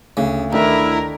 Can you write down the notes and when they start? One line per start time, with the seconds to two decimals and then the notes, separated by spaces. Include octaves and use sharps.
0.17 D2 C#3
0.53 D2 D#3 A3 D4 E4 A#4